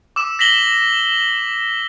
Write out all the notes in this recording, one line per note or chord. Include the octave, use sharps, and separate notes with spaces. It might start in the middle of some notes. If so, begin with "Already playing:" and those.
D6 E6 E7
A#6 B6 F#7 G7